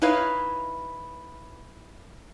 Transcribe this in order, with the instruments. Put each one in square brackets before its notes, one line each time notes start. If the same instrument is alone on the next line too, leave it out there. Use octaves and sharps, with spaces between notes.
[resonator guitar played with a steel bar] D#4 E4 B4 C#5 F5